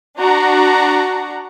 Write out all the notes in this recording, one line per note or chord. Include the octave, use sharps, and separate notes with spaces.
D4 F#4 A#5